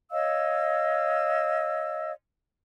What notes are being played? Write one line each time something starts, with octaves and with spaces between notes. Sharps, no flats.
C#5 D#5 F5 E6